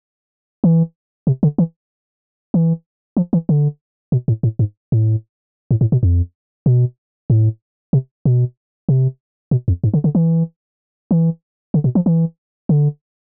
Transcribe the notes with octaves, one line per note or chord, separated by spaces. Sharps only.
E3
C3
D3
E3
E3
F3
E3
D3
B2
A2
A2
G#2
A2
A2
A2
B2
F2
B2
A2
C3
B2
C3
B2
F2
G#2
D3
D3
E3
E3
D3
B2
F3
E3
D3